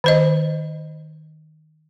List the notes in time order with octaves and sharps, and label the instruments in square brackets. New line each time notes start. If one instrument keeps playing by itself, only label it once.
[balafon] D#3 C5 D#5